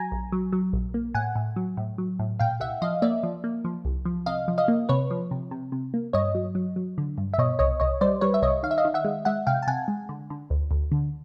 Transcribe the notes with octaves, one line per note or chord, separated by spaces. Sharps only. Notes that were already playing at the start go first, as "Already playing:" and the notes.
Already playing: F#3 G#5 A#5
A#1
F#3
F#3
A#1
A#3
A2 F#5 G#5
A2
F#3
A2
F#3
A2
A#2 F5 G5
C2 E5 F#5
F3 D#5 F5
A#3 D5 E5
F3
A#3
F3
C2
F3
C3 D#5 F5
F3
D#5 F5
A#3
C3 B4 C#5
F3
C3
C3
C3
A#3
G2 C#5 D#5
F#3
F#3
F#3
D3
G2
E5
B2 C#5 D#5
C2 C#5 D#5
C2 C#5 D#5
G3 C5 D5
G3 B4 C#5
E5
C2 C#5 D#5
D#3 F5
E5
D#5 F5
D#3
E5 F#5
G#3
G#3 E5 F#5
C3 F5 G5
A5
C3 F#5 G#5
G#3
D3
D3
D2
D2
D3